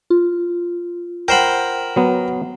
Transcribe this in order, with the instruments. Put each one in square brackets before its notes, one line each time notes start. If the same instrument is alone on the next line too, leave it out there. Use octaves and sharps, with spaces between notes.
[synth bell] F4
[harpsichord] A#4 C5 B5 [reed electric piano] F#5 G5
[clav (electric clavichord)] F#3 B3